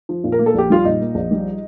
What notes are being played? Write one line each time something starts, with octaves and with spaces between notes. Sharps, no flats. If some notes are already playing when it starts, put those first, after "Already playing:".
F3
A#2
A#4
A#3
A4
A#1 G4
G3 F4
A#2 D#4
A#3
A#1
G3